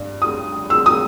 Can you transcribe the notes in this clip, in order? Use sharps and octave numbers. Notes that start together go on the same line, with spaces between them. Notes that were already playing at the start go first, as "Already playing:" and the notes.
Already playing: G2
D#6
E6
D#6